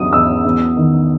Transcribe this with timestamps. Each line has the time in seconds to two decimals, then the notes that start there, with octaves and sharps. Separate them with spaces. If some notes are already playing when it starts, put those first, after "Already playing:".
Already playing: E2 C#3 F#3 D#6
0.12 E2 E6
0.45 E2
0.76 D#3